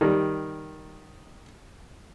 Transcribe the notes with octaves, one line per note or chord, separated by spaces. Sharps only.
D#3 G3